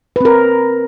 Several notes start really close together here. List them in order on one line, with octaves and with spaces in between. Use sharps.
B4 C4 A#4